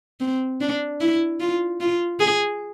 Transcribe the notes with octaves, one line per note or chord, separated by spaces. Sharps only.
C4
D4
E4
F4
F4
G#4